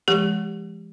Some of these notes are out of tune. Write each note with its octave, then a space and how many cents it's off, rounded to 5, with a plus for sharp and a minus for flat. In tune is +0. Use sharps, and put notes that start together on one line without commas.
F3 -40 G#3 +0 G4 +10